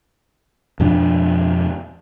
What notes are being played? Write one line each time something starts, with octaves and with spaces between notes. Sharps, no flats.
F2 B2 F3 D4